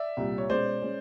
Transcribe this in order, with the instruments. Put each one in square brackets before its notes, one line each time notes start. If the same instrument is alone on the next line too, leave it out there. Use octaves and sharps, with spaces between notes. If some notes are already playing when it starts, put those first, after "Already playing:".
Already playing: [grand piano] D5 E5
[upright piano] C2 A#2 G3
[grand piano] C#5
[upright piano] B2 G#3 C#4 [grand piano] C5 D5
[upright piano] G#3 C#4